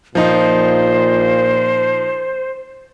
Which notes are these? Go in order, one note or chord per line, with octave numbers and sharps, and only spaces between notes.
A#2 F3 D#4 C5